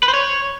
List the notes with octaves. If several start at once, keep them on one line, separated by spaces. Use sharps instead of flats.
B4
C5
C#5